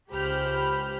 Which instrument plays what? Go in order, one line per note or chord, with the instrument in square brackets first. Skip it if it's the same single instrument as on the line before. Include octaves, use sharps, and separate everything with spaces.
[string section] C#2 G4 C5 B5 F6 G6